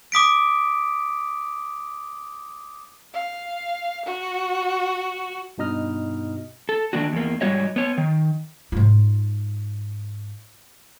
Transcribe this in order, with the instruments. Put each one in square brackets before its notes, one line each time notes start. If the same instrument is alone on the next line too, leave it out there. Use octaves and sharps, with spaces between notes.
[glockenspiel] D6 D#6 B6 D7
[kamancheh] F5
F#4
[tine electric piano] G2 B2 D#4 D#5 F6
[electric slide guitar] A4
D3 D#3 A#3 D4 F#4
E2 A#3
G#2 G3 F#4 C#5 D#5
B3 C#5
D#3
[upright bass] G#2 F4